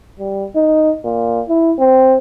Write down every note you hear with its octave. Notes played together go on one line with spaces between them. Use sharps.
G3
D#4
A#2
E4
C4